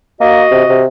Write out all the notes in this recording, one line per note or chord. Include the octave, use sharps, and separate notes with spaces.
A#3 F#4 D#5
C3
C3